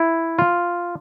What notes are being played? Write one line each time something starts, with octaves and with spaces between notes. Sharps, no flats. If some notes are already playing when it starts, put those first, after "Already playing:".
Already playing: E4
F4